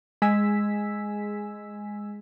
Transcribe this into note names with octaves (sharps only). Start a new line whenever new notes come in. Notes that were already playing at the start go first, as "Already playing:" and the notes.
G#3 G#5 E6 B6